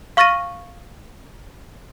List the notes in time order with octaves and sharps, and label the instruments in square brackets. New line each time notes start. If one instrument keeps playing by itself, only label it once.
[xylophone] F5 C#6 F6 A6 A#6 D#7